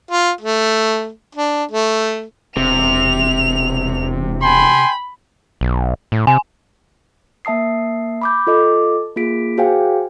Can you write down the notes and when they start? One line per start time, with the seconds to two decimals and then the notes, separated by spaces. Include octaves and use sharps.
0.11 F4
0.41 A3
1.35 D4
1.71 A3
2.57 E1 C3 F7
4.43 G5 G#5 B5 C6
5.61 B1
6.12 A2
6.27 C3 G#5
7.45 A#3 E5 A5 D#6 C7
8.22 B5 D6 G6
8.47 F4 A4 D#5 D6
9.16 A#3 F4 G#4 B6 D7
9.58 F#4 G#4 C5 F5 G5 G#5